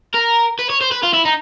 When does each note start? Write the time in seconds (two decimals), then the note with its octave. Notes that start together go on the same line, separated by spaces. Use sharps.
0.14 A#4
0.59 B4
0.70 C#5
0.81 C5
0.91 B4
1.03 F4
1.13 E4
1.25 D#4